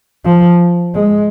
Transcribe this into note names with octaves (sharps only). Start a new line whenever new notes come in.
F3
G#3